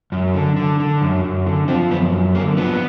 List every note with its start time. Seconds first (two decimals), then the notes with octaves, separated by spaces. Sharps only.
0.12 F#2
0.34 D3
0.57 D3
0.80 D3
1.02 F#2
1.24 F#2
1.46 D3
1.68 F3 C4
1.91 F#2 B3
2.12 F#2
2.35 D3 A#3
2.57 F3 B3